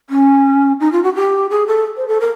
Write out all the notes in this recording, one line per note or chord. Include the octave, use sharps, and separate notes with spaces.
C#4
D#4
F4
F#4
G4
G#4
A4
C5
A4
A#4